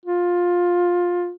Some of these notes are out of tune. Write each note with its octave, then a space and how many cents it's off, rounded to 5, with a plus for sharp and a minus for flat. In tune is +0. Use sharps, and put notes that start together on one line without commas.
F4 +15